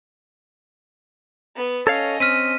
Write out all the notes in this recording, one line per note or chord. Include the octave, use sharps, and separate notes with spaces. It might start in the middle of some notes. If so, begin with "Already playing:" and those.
B3
C#4 A4 C#5 D#5 F5
C4 F6 B6 D#7